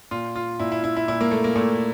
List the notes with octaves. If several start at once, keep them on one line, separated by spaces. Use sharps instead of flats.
A#2 F4
F4
A#2 E4
E4
E4
E4
A#2 E4
A#3
A3
A#3
A#2 A3